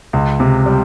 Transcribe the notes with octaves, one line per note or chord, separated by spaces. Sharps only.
C#2
C3
G3